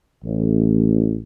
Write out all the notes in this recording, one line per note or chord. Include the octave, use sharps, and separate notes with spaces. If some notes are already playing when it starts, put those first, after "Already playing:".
A1